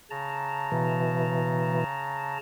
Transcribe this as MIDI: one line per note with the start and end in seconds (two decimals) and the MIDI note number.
0.10 2.38 49
0.10 2.38 81
0.10 2.38 82
0.72 1.84 47
0.72 1.84 52